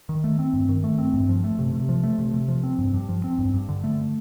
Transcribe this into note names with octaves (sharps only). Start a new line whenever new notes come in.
D#3
A3
C4
G2
D#3
A3
C4
G2
F3
A3
C3
C3
F3
A3
C3
C3
F3
C4
G2
G2
F3
C4
G2
G2
D3
A3